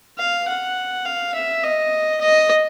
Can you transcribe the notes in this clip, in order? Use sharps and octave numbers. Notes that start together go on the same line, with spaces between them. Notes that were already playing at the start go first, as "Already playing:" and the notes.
F5
F#5
F5
E5
D#5
D#5